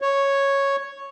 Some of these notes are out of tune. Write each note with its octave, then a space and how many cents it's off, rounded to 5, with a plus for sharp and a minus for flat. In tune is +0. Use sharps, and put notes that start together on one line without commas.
C#5 -5